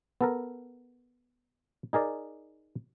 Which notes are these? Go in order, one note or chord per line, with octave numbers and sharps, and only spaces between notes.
B3 A4 A#4
D#4 G#4 A#4 D5